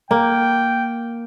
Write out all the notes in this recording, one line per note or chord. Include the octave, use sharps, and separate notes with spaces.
A#3 G5